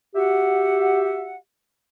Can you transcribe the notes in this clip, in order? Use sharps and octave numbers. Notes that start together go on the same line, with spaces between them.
F#4 G4 E5 F#5